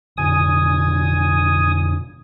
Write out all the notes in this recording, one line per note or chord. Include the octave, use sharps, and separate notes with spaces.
F2 B2 D3 G#5 D#6